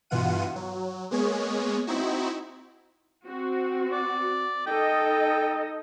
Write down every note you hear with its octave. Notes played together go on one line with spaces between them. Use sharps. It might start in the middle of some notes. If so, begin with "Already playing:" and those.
G2 B2 E3 F4 F#5 D#7
F#3
G#3 A#3 B3 G#4 C#5
C4 D#4 E4 F#4
C4 F#4
D5
D#4 A4 D#5 G5